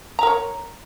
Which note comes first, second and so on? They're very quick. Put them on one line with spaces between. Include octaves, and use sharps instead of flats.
A#5 A#4 C#5